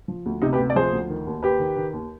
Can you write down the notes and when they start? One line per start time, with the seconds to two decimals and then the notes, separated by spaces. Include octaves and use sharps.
0.08 F3
0.26 D2
0.42 C3 D#4
0.53 G4 B4
0.59 D2
0.70 D5
0.76 F3 G#4 C5
0.93 D2
1.10 D#3
1.27 D#2
1.43 D#2 G4 B4
1.59 D#3
1.77 D#3
1.93 D#2